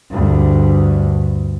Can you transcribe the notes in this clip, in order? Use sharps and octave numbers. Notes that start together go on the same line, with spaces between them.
D2 G2